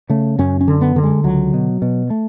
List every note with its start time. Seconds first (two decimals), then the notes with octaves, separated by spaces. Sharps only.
0.10 C#3 A3
0.39 F#2 C#4
0.61 C#4
0.68 D3
0.81 B3
0.96 D3
1.03 G#3
1.24 C#2 F#3
1.54 B2
1.82 B2
2.10 A3